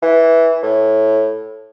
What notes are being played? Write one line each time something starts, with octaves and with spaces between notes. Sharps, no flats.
E3
A2